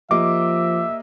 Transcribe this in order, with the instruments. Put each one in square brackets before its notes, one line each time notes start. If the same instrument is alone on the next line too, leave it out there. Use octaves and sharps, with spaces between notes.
[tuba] F3 [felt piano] A#3 G4 D#5 [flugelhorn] E5 [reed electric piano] D6